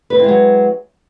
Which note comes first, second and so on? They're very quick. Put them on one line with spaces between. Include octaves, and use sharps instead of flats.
B4 C4 E4 G#3 F#3